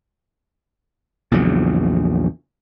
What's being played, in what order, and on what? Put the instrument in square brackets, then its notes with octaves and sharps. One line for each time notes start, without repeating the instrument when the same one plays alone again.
[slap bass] A#1 E2 C#3 F#3